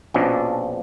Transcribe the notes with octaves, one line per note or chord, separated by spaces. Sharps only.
A#1 B2 F3 C#4 D4